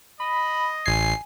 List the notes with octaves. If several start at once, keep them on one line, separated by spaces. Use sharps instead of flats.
D#5 B5
A1 G#5 C7